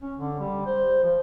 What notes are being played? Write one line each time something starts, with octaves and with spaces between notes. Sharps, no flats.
C#4
D3
G3
C5
F3